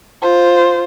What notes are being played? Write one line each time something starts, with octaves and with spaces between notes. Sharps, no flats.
F4 C5